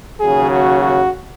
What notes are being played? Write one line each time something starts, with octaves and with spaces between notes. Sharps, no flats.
D#2 C#3 F#3 G#4
F#4
F#4